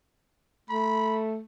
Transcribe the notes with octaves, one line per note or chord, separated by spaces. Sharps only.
A3 B5